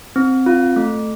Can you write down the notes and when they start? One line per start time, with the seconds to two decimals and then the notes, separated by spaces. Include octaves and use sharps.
0.16 C4
0.46 F4
0.76 A3